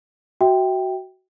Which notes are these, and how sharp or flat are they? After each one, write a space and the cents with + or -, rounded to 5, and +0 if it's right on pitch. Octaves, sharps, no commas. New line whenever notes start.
F#4 +15 E5 -20 G5 +0